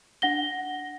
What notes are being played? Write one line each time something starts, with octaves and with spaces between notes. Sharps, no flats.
D4 F#5 A#6 G7